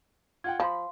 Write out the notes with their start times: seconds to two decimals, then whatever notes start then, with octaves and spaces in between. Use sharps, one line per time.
0.44 F4 F#5 G5 G#6
0.60 F3 F5 B5 C6